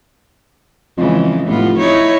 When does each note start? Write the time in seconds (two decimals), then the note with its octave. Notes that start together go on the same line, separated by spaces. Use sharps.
0.98 F2 C#3 E3 G#3
1.47 F1 A2 B3 F4
1.79 D#4 E4 C#5